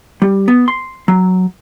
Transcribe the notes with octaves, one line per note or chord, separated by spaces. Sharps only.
G3
B3
C6
F#3